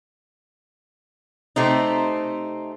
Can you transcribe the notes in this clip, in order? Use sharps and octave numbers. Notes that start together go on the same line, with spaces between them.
C3 A3 C4 D#4